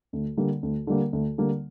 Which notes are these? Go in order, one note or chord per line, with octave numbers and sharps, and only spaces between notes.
D2
D3 G3 A#3
D2
D3 G3 A#3
D2
D3 G3 A#3